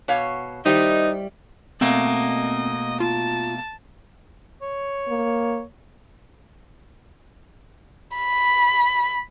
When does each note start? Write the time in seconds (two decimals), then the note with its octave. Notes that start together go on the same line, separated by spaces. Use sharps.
0.08 B2 C#5 F5
0.66 D#3 G3 D#4 E4 G4 C5 D#5
1.81 B2 A3 A#3 C4 D#5
3.00 F4 A5
4.62 C#5
5.09 A#3
8.17 B5